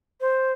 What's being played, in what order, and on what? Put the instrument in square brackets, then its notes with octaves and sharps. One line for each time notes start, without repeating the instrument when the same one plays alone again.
[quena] C5